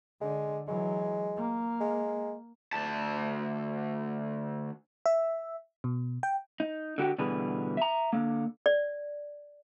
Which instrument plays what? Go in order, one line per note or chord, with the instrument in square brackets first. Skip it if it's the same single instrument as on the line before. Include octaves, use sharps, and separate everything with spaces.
[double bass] D3 [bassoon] G#3
[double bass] E3 F#3 [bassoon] G#3
[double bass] A#3
[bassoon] G#3
[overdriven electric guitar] D2 A5
[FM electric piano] E5
B2
G5
[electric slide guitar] D#4
D3 F#4 G4
B2 D3 E3 G3 G#4 B4
E5 A#5
D3 A#3
[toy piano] D5